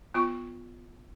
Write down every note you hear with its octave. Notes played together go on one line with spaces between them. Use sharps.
B3 F4 C#6